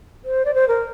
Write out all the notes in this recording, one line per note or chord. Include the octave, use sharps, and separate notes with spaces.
C5
D5
C5
A#4